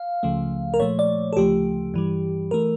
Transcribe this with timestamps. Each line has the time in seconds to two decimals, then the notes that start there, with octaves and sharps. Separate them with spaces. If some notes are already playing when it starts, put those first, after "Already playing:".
Already playing: F5
0.23 C#2 C#3 F3 A3
0.74 A#4
0.80 A#2 F3 A3 C#5
0.99 D5
1.33 A4
1.36 D2 C#3 F3 A3 G4
1.94 G2 E3 G3
2.51 E3 A3 A#4